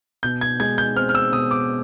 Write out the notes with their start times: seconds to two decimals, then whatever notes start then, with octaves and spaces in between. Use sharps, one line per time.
0.23 B2 G6
0.41 G#6
0.60 G#3 G#6
0.78 G6
0.96 C4 F6
1.09 F6
1.15 E6
1.32 B2 D#6
1.51 D6